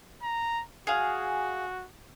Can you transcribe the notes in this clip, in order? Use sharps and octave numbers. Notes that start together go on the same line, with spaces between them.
A#5
F#4 G#4 F5